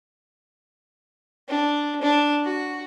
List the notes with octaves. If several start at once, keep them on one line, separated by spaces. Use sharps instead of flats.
D4
D4
F#4